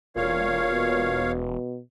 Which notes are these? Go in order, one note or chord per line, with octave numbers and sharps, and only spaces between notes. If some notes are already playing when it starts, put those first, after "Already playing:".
E1 A#2 C#5 F5
B2